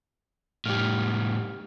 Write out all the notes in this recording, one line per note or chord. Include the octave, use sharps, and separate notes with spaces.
A2 G3 G4 F6